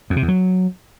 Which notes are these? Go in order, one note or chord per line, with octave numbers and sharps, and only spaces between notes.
F2
C3
E2
F#3